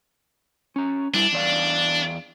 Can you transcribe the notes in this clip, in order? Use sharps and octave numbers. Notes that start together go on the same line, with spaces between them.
C#4 A#5
G3 D4 E4
E2 D5 F5